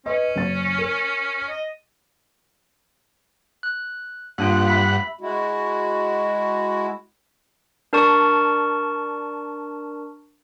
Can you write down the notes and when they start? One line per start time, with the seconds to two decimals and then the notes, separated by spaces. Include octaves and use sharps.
0.06 C#4 B4 D#5
0.36 F#1 A6
0.78 A#4
1.48 D#5
3.63 F#6
4.38 G2 A#3 D4 F4 F#5
4.68 E5 B5 B6
5.21 G#3 E4 F#4
7.93 D4 A#4 D5 A5 C#6